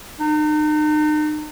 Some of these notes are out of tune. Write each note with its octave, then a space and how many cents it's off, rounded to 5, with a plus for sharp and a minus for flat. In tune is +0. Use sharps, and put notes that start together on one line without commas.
D#4 -40